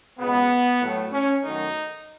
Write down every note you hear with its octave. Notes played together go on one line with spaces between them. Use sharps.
C#2 B2 G#3 B3
A2 F#3 A3
C#4
F#2 D#3 A3 D#4